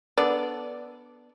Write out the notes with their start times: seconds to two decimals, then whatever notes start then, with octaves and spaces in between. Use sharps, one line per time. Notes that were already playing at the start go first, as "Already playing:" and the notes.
0.18 B3 D4 A4 D5